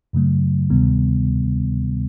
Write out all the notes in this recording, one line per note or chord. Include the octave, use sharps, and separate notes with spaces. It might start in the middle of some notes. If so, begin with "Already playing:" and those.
F#2 C#3 F#3 A3
D2 C3 D#3 G3 B3